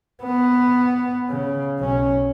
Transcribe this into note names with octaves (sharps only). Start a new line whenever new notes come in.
B3
C#3
B1 C#4